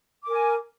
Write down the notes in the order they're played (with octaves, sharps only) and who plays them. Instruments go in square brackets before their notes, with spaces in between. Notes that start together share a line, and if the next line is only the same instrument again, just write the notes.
[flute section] D6
A#4
G#5